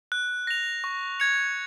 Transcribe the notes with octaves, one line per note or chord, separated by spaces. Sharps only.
F#6
A#6 F7
C#6
G#6 C#7 F7